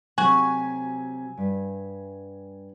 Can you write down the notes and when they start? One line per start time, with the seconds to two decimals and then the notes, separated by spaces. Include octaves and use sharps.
0.18 C3 F#3 A3 F#4 G#5
1.38 G2